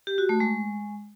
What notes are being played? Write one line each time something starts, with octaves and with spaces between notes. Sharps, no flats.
G4
F#4
A3
G#3